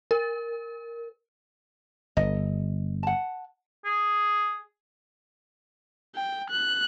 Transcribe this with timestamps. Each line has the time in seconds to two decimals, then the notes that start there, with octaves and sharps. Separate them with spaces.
0.11 A#4
2.17 G1 D#5
3.03 F#5 A5
3.85 G#4
6.15 G5
6.50 F#6